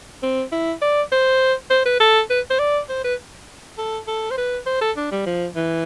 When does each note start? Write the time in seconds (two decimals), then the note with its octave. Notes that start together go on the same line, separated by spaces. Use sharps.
0.23 C4
0.52 E4
0.81 D5
1.12 C5
1.70 C5
1.85 B4
2.00 A4
2.30 B4
2.50 C5
2.59 D5
2.89 C5
3.04 B4
3.78 A4
4.07 A4
4.31 C5
4.37 B4
4.66 C5
4.81 A4
4.96 D4
5.11 G3
5.26 F3
5.56 E3